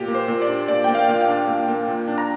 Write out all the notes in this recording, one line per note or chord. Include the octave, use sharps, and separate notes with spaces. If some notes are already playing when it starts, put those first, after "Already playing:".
Already playing: A#2 G4
A#3
C5
A#2
D5
D4
A#2 D5
A#3 G5
F5
A#2
G5
D4
A#2 G5
A#3
A#2
D4
A#5